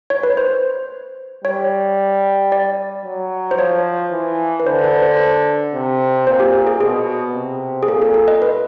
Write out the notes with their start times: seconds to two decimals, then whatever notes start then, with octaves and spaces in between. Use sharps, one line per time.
0.10 C#5
0.23 B4
0.37 C5
1.44 G3 C#5
2.52 D5
3.05 F#3
3.51 C5
3.58 F3 C#5
4.12 E3
4.60 B4
4.65 D3 C5
4.84 B4
5.02 C5
5.74 C3
6.27 A#2 C5
6.40 G4
6.67 G#4
6.81 B2 G#4
7.35 C3
7.83 G#4
7.87 A#2 A4
8.02 A4
8.14 A4
8.28 D#5
8.42 B4